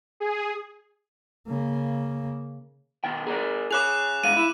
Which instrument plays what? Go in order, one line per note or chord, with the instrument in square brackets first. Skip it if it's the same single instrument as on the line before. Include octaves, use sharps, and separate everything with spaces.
[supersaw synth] G#4
[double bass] C#3 A#3
[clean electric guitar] B2 D#3 G5
G#4 A#4 D5
[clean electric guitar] G#4 C#5 [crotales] D6 F#6 F7
[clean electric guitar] E2 G#3 F5 [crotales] D#7
[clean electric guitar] E4